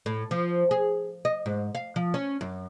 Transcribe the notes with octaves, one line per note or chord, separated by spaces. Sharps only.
A2
F3
G#4
D#5
G#2
F5
F3
C#4
F#2